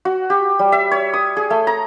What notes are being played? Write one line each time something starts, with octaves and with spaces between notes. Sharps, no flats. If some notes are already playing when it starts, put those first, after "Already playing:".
F#4
G4
G3
E5
C#5
D#6
G#4
A3
A#5